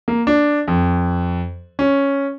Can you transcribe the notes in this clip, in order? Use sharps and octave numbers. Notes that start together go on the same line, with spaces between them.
A#3
D4
F2
C#4